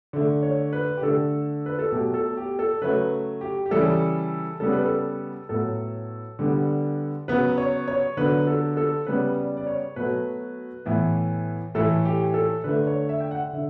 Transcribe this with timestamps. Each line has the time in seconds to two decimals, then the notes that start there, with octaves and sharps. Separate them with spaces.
0.13 D3 A3
0.43 C#5
0.73 B4
0.97 G4
1.02 D3 A3 A4
1.66 B4
1.79 A4
1.92 B2 F#3 A3 G4
2.14 A4
2.37 G4
2.59 A4
2.81 C#3 F#3 A3 B4
3.41 G4
3.66 G4
3.71 C#3 E3 G3 A4
4.60 C#3 G3 B3 A4
4.72 B4
4.84 A4
5.49 A2 F#3 B3 A4
6.39 D3 G3 B3
7.28 C#3 F#3 B3 B4
7.58 C#5
7.88 C#5
8.17 D3 F#3 B3 B4
8.47 A4
8.77 A4
9.06 C#3 G3 B3 B4
9.37 D5
9.57 D5
9.67 C#5
9.96 B2 F#3 A3 B4
10.86 A2 E3 B3
11.75 A2 E3 A3 A4
12.05 G4
12.34 A4
12.64 D3 A3 B4
12.87 C#5
13.09 E5
13.21 G5
13.31 F#5
13.53 D3 E5